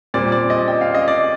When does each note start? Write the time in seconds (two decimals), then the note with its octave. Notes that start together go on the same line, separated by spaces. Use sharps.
0.14 A#2 G3 C4 D5
0.32 D5
0.50 D#5
0.68 G5
0.81 F5
0.95 D#5
1.08 D5